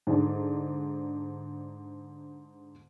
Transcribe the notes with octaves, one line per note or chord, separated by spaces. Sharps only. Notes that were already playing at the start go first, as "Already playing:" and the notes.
G#2 D3 D4